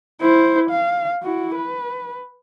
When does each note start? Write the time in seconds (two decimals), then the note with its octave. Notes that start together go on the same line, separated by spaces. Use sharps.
0.21 E4 C5
0.70 F5
1.23 E4 F#4
1.54 B4